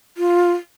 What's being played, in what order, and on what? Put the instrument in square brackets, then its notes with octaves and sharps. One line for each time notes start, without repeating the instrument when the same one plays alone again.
[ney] F4